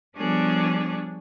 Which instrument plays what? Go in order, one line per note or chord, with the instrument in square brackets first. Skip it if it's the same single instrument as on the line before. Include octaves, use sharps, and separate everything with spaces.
[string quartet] F3 G3 B3 D4 G#4 C#5